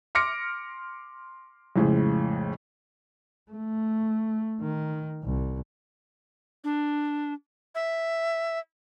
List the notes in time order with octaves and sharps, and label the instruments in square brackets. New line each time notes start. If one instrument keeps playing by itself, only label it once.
[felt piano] C6 D6 F6 A#6 C#7 D7
F2 A2 C#3 G#3
[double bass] A3
D#3
C2
[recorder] D4
E5